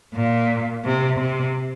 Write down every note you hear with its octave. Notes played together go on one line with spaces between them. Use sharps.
A#2
C3
C3